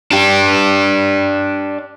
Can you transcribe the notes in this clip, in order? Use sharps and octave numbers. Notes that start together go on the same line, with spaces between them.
D4 G4